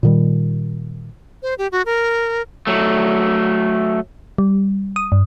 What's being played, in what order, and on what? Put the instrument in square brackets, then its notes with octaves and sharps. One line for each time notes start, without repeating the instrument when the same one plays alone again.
[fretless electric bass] A#2 D#3 G3
[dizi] C5
G4
F#4
A#4
[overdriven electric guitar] F#3 A3
[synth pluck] G3
D#6
G2